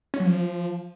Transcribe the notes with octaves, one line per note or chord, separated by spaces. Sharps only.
C#4
F#3
F3